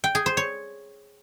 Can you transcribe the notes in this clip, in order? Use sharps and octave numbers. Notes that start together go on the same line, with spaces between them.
G5
G#4
C5
C#5